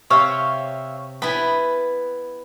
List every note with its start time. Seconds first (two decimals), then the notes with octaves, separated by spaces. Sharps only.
0.10 C3 C#5 E5 F5 C6
1.22 B3 E4 G#5 B5